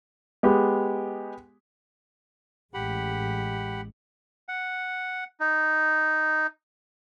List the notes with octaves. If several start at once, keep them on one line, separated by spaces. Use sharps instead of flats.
G#3 B3 G4
A1 G#3 G4 F#5 B5
F#5
D#4